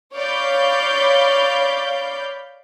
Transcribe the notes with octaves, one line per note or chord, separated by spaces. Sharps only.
C#5 D5 F5 B5 G6